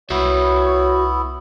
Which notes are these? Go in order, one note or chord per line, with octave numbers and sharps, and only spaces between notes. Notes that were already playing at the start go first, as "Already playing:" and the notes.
C2 B3 E4 F#4 C#5 E5